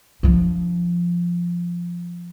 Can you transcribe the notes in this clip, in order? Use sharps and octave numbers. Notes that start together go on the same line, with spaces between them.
F3 D4